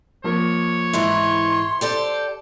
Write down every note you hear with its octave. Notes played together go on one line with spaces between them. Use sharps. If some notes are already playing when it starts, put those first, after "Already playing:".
F3 A#3 C#5
G#2 E3 E4 G#4 C6
G4 A4 C5 D5